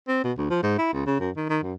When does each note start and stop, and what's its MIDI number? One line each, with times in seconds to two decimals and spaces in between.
0.08 0.24 60
0.24 0.32 47
0.37 0.46 38
0.50 0.59 53
0.63 0.77 44
0.79 0.88 64
0.93 1.05 37
1.06 1.19 49
1.20 1.30 42
1.36 1.45 51
1.49 1.58 51
1.63 1.73 42